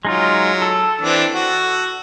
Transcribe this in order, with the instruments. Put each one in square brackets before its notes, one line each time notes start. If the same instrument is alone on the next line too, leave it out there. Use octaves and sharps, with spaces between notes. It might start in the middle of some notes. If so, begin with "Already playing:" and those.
[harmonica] F#3 [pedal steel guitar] G#3 D#4 F4
[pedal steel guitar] A4
[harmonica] E3 C4 D4
F#4